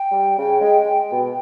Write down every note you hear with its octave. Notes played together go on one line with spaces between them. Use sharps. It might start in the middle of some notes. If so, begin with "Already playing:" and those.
Already playing: G5
G3
C#3
G#3
G#3
B2